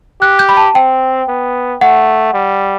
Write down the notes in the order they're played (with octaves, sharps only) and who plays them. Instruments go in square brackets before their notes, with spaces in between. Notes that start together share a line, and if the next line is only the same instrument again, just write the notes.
[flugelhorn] G4 [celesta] F#6
[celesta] G6
B5
A5
[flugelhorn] C4 [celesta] G5
[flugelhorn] B3
[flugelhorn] A3 [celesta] F#5
[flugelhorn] G3